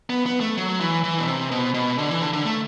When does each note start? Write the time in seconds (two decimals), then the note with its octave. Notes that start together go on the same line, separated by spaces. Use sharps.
0.10 B3
0.26 B3
0.40 A3
0.57 F#3
0.80 E3
1.04 E3
1.19 B2
1.27 C3
1.51 B2
1.74 B2
1.98 D3
2.10 E3
2.21 D3
2.33 D3
2.45 A3